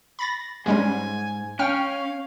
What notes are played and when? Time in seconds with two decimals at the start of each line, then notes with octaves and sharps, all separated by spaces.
0.19 B5 A6 A#6
0.66 G#2 G3 G#3 C#4 G#5
1.59 C#4 F5 G5 F6